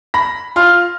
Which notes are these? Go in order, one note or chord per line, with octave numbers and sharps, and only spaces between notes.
B5 A#6
F4 C6 F6